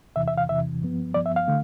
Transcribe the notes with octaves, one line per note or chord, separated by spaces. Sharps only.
E2 C3 E3 E5
E5
F5
E2 C3 E3 E5
G2 F3 B3
G2 F3 B3 D5
E5
F5
D3 A3